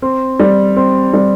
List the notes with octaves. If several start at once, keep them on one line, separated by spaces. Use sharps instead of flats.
C4
G3
C4
G3